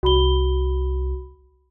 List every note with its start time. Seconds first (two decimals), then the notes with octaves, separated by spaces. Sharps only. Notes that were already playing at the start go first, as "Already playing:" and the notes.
0.03 C2 F#4 B5 G7